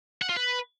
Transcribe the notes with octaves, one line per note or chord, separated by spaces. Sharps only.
F#5
F4
B4